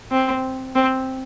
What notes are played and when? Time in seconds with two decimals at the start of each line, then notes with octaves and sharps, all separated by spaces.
0.11 C4
0.75 C4